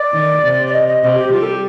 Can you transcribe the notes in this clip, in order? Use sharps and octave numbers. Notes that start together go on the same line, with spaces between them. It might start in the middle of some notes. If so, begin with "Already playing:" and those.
Already playing: D5
D#3
C3
D5
D#5
D#5
C3 D#5
G4
G3 F4
A4
G4